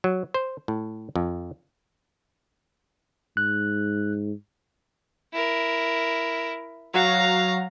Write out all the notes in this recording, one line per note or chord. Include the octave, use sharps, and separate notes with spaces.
F#3
C5
A2
F2
G#2 F#6
E4 A#4
F#3 F#4 F5 A#5